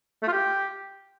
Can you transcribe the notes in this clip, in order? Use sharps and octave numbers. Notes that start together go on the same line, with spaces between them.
A3
F4
G4